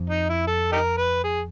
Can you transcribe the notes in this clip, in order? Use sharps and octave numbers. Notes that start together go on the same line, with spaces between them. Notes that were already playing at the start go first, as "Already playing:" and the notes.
Already playing: F2
D#4
E4
A4
D#4 G4 A#4
B4
G#4